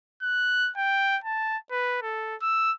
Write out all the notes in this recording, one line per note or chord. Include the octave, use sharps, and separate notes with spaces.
F#6
G5
A5
B4
A4
E6